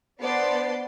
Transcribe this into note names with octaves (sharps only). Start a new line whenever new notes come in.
B3 D4 B4 C5 D5 C6